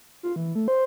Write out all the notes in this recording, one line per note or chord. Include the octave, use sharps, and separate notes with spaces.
F4
E3
A3
C5